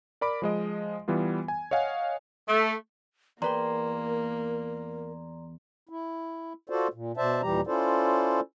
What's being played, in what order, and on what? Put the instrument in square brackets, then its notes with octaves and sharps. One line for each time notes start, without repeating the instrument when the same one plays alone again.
[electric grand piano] A#4 D5 B5 D6 D7
F3 G#3 D#5
E3 G3 B3 F4
G#5
C#5 D#5 F5 F#5 G#5
[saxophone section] A3
[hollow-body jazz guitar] E2 B4 G5 [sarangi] A#3 [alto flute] A#4 [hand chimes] D5 A#5 C6
[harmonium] E4
F4 F#4 A4 C5 D5
A#2
B2 C5 D5 E5 A5
D#2 A#2 E3 G3 G4 A#5
C#4 E4 F4 A4 C5 D5